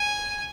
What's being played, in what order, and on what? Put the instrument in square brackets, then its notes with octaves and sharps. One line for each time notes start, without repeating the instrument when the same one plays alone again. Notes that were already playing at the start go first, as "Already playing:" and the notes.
Already playing: [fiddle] G#5